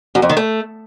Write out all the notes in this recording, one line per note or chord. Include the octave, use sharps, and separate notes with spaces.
F#2
F2
D#3
A3